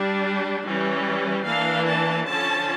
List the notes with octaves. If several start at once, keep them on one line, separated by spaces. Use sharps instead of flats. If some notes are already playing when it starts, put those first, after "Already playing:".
Already playing: G3 D4
E3 G3 C#4
E3 A#3 D4 F5
A5
D3 F3 C#4 A5